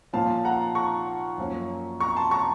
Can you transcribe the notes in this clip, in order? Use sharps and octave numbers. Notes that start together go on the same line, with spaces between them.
A#2 F3 A#3 C#4 F5 A5
F#5 A#5
A#5 C#6
F#2 F3 A#3 C#4
A#5 C#6
A5 C6
A#5 C#6